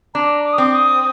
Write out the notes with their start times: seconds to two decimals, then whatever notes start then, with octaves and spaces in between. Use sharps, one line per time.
0.14 D4 A#5
0.44 D6
0.53 D#6
0.58 C4 D6
0.74 D#6